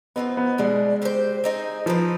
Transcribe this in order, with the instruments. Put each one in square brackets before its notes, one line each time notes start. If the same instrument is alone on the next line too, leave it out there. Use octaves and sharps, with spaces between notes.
[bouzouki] F3 C4 D#4 B4 [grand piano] B3
[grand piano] B3
[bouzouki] B2 G3 D4 [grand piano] G#3
[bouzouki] C4 G4 C5
C4 D#4 G#4
[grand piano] F3 [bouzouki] C4 D#4 B4